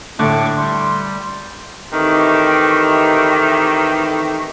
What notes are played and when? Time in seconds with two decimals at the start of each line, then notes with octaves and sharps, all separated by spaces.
0.19 A2 D3 A3 A5 C#6 D6
0.57 G3 C6
1.92 D#3 E3 A3 C4 G4